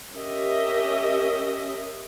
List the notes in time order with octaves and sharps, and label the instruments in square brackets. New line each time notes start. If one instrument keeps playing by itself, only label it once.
[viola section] C#4 G4 A#4 D#5 E5